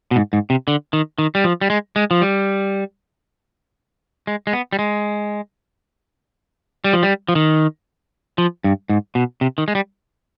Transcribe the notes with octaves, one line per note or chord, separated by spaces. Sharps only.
B2
G#2
G#2
C3
D3
D#3
D#3
G3
F3
G3
G#3
G#3
F3
G3
G#3
G#3
B3
G3
G#3
G3
F3
G3
F3
D#3
F3
G2
G#2
B2
C3
D#3
G#3
G3